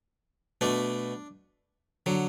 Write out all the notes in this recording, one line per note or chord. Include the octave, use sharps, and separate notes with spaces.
B2 A3 D4
D3 F#3